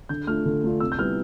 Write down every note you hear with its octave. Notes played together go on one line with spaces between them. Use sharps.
D3 G6
A3 D4 F4 F6
D3
A3 D4 F4
C3 E6
G6
G3 B3 E4 F6